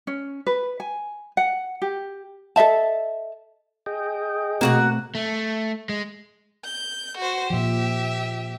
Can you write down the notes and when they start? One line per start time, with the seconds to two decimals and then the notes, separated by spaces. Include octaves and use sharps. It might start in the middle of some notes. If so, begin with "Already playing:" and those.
0.07 C#4
0.47 B4
0.80 G#5
1.37 F#5
1.82 G4
2.56 A4 D#5 E5 A5
3.86 G#4 D#5 G5
4.61 B2 A3 A#3 C4 F#4 F#5
5.15 A3
5.89 G#3
6.65 G6
7.18 F#4 C5
7.50 A#2 F3 G4 E5